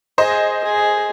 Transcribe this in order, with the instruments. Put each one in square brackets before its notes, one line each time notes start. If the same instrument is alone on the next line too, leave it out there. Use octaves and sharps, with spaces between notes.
[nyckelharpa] G#4 [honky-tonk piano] C5 D#5
[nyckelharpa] G#4